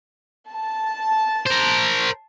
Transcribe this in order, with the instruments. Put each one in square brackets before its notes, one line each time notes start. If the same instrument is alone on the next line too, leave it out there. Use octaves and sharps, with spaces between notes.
[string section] A5
[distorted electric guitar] A#4 C5